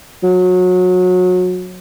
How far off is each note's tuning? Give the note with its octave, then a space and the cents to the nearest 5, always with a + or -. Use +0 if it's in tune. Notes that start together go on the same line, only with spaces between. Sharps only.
F#3 -25